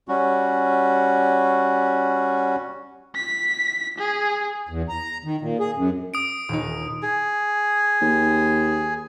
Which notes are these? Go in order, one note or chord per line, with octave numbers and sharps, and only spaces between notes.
G3 C#4 F#4
B6
G#4
E2
A#5
D#3
A#2
G#4
F#2
D#6 D7
D#1 D#4
G#4
D#2